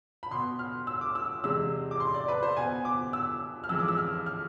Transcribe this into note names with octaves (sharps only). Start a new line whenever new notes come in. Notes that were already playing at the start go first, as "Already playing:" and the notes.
B5
B2 B3 C6
F6
E6
D6
E6
E2 C3 G#3 E6
D6
C6
D5
B4
C5
B2 B3 G#5
D6
E6
F6
F2 E3 G#3 E6
D6
E6
F6
F6